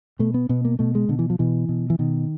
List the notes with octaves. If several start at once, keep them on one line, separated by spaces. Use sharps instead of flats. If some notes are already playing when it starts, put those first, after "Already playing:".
B2 A3
B3
B2 B3
A#3
B2 A3
G#3
B2 D3
E3
F3
B2 E3
B2
E3
B2 D#3